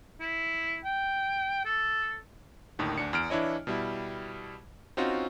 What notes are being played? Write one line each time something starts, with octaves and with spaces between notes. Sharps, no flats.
E4
G5
A4
D#2 A2 D3 D#3
D2 D4 C#7
E2 F6 D7
E3 D4 E4 C#5 D#5
B2 G3 E4
C4 C#4 D#4 F4 F#4